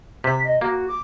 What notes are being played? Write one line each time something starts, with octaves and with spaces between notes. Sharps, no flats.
C3 B6
D#5
A#3 F#4
D6